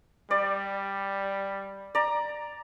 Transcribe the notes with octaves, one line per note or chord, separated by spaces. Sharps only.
G3 D5
D5 A#5